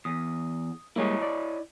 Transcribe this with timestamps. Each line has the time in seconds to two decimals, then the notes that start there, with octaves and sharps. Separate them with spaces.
0.05 E2 D#6
0.96 G3 G#3 A#3 E4 C#5 D#5
1.22 D5